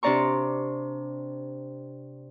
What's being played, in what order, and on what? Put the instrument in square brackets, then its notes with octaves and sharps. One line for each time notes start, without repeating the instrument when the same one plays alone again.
[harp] C3 D4 D5 A#5 C#6